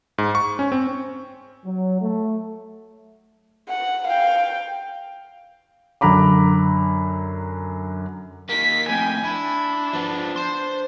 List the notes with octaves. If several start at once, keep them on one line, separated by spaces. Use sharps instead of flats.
G#2
C#6
C#4
C4
F#3
A3
F#5
F5 G5
F#2 D3 A#5 B5 D6
A#3 D#4 B6
F2 A2 G5 G#5
D4 E4
F3 B3
C5 C6